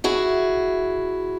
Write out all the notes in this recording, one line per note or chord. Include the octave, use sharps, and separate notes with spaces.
E4 F#4 G#4